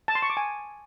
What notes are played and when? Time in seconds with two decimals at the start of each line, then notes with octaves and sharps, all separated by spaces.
0.08 A5
0.15 C6
0.22 C#6
0.30 D6
0.37 G#5